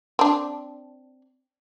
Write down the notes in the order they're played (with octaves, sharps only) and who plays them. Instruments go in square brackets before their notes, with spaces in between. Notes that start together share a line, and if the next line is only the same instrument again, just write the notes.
[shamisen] C4 D4